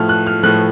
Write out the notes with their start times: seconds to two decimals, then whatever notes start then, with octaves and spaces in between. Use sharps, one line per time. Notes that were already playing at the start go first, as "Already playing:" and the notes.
Already playing: A2 F3 A3 F6
0.09 F#6
0.26 F6
0.43 A2 F3 A3 F#6